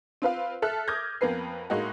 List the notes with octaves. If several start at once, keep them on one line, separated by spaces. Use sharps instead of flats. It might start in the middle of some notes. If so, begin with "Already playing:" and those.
C4 F4 B4 F5
A4 E5 A5 F6 F#6
D6 D#6 F6 G6 G#6 A#6
F2 A#3 B3 B4 C7
A2 G#3 A#3 D#4 F#4